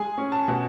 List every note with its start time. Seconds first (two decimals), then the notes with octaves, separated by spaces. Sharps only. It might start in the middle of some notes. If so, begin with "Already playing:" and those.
Already playing: G#3 G#4 G#5
0.18 C#4
0.32 A5
0.48 B2